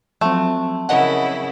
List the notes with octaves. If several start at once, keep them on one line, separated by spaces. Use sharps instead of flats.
F3 F#3 A3 C4
C#3 E4 A#4 D#5 F#5